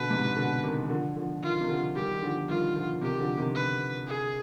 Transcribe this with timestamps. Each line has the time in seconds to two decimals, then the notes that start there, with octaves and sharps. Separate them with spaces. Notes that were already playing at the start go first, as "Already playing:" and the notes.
Already playing: B2 D3 B4
0.10 G#2 C3
0.36 B2 D3
0.63 C3 D#3
0.85 D#3
0.90 D3 F3
1.17 D3 F3
1.43 D#3 F4
1.51 F3
1.60 C3 D#3
1.69 D3 F3
1.95 D#3 G3 G4
2.13 D#3
2.22 D3 F3
2.38 F3
2.49 D#3 G3 F4
2.76 D3 F3
3.01 C3 D#3 G4
3.20 D3 F3
3.37 C3 D#3
3.55 B4
4.07 G#4